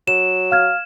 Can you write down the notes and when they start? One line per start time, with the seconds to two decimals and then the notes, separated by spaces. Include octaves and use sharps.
0.08 F#3 E7
0.51 F5 F6 G#6